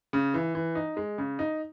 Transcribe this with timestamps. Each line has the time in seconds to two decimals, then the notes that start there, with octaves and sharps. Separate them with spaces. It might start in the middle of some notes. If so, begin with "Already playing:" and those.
0.13 C#3
0.34 E3
0.55 E3
0.75 D#4
0.97 G#3
1.18 C#3
1.39 D#4